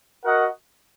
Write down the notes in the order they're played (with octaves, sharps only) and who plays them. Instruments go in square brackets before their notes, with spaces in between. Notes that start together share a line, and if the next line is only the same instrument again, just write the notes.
[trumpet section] F#4 A#4 D#5 F#5